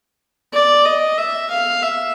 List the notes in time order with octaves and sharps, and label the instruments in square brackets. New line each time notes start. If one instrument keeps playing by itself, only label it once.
[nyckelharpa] D5
D#5
E5
F5
E5